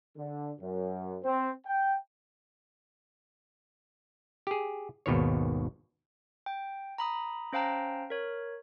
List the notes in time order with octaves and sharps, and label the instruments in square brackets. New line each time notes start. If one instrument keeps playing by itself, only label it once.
[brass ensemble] D3
F#2
C4
G5
[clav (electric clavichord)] G4 G#4
G#1 D#2 B2 D#3 C#5
[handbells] G5
A#5 B5 D#6
C#4 C5 F5 G5 A5 A#5
A#4 C#5